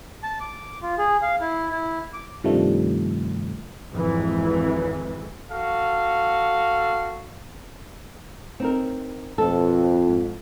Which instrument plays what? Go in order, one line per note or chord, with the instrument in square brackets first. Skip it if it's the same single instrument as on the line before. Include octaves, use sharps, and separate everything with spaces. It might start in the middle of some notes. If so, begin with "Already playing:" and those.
[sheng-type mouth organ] A5
D6
F4
G#4
F5
E4
E4
D6
[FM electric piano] G2 C3 D#3 F3 G3 A3
[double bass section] G#1 F2 G#2 E3
[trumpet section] F#4 A4 F5
[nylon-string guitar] C4 D#4 A#4
[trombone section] F2 [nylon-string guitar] B2 A4
[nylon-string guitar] G#2